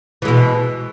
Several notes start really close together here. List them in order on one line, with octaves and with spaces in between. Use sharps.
E3 G#3 B2